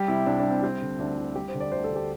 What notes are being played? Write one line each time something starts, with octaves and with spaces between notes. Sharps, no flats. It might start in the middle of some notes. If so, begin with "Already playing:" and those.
Already playing: G3 G4
C3 E4
C2 D4
D4
C2
C4
G3 C4
D3
D2 D4
D2 E4
G3 G4
C5
D3
D5
D2 C5
A4
D2
G4